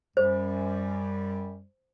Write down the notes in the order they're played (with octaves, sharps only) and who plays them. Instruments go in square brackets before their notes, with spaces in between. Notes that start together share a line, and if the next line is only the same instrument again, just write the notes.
[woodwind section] F#2 G3 [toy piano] C5